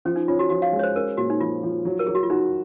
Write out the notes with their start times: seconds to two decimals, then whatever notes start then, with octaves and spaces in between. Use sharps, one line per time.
0.05 F3 C#4
0.16 D#4
0.28 C#4 F4
0.39 F#4
0.50 F3 F#4
0.62 F5
0.73 G#3
0.79 C#5
0.83 C5
0.95 C#4 A#4
1.17 A#2 F#4
1.30 D#4
1.40 F3 F4
1.63 F3
1.85 F#3
1.99 A#4
2.07 F#3 G#4
2.15 F#4
2.23 F4
2.30 D#4 F#4